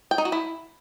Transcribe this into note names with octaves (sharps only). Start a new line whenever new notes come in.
G5
D#4
F#4
E4